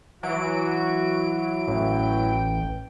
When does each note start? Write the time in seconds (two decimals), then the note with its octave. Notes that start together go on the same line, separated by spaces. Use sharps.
0.23 E3 F#3 F#4 D7
1.68 A1 G5